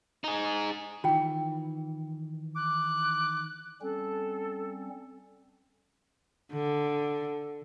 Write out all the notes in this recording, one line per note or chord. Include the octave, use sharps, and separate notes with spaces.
D#4 G#4
D#3 E3 F4 G5
D6 F#6
G3 C4 C#4 A4
D3